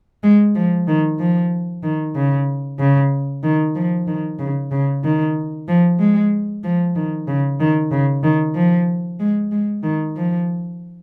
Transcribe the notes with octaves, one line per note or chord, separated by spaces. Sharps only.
G#3
F3
D#3
F3
D#3
C#3
C#3
D#3
F3
D#3
C#3
C#3
D#3
F3
G#3
F3
D#3
C#3
D#3
C#3
D#3
F3
G#3
G#3
D#3
F3